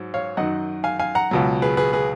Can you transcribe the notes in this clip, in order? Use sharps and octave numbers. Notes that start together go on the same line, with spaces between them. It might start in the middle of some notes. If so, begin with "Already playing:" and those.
Already playing: G#2 F#3
C#5 F5
F#2 D#3 F#3 D#5 F#5
F5 G#5
F5 G#5
F#5 A#5
C#2 B2 F#3
G#4 B4
G#4 B4
G#4 B4